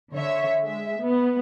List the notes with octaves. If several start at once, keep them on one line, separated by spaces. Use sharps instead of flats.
D3 C#5 E5
G#3 E5
B3